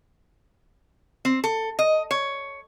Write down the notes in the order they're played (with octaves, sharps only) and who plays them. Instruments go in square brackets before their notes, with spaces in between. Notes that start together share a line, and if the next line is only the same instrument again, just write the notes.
[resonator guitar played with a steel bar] C4
A4
D#5
C#5